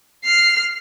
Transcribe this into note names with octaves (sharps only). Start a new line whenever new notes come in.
F6 C7